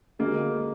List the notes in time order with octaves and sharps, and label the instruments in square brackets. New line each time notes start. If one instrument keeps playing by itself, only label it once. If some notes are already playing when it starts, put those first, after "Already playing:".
[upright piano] D2 G#3 A#3